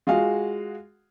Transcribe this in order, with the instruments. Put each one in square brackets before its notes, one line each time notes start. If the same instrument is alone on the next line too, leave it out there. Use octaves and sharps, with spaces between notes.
[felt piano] G#3 F4 F#4 G#4 F5 F#5